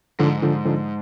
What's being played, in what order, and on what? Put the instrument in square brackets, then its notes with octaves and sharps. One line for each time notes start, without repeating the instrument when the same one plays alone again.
[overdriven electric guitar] G#2 [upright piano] D3 F3
[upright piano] D3 F3
D3 F3